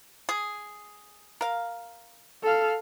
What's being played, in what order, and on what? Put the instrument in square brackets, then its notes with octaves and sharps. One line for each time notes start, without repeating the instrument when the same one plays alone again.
[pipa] G#4
A#4 F5
[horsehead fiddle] A4 F5